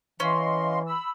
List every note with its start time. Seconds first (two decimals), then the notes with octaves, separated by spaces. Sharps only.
0.20 E3 C#4 D#5 F5 C6
0.86 B5 E6